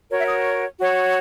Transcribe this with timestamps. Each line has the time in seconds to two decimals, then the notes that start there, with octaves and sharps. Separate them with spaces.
0.10 F#4 A#4 C#5
0.18 E5
0.27 D#6
0.79 F#4 C#5